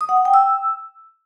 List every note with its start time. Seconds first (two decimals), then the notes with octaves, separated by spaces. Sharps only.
0.01 D#6
0.09 F#5
0.17 D#6
0.25 G5
0.34 E6